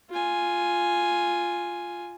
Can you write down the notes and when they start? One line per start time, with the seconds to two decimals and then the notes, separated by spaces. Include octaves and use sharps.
0.10 F4 G#5